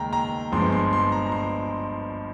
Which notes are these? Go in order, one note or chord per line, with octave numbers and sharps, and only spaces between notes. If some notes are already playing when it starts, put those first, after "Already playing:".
Already playing: D#2 C#3 G#3 G5 A#5
A#5
G1 G2 F3 G#3 C6
C6
C6
A#5
A#5
C6